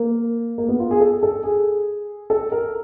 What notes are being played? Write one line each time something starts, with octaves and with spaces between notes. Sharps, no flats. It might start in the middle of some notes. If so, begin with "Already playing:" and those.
Already playing: A#3
A#3
B3
F4
G#4
A4
A4
G#4
A4
A#4